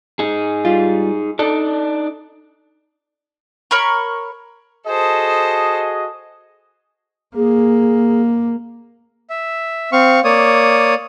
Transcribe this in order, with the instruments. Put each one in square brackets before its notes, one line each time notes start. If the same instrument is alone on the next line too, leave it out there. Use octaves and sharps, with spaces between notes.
[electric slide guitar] D#4 G#4
[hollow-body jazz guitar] G3 F4
[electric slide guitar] D4 D#4 D5 [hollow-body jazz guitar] A4
[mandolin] A#4 C#5 B5 C#6
[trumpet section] F#4 G#4 D#5 [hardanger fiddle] A4 C5
[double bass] A#3 [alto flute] G#4
[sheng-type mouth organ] E5
C4 F5 C#6
A#3 C#5 D5 D#6